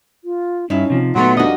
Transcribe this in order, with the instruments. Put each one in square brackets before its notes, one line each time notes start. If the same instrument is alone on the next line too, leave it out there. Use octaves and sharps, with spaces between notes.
[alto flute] F4
[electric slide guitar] G2 E4 [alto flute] C#4 [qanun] D#4 F5
[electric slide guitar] C3 F3
[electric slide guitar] A#2 A3 B3 [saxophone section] F#3 [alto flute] C6
[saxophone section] F2 A#3 D#5 [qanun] G3 F#4 [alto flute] D4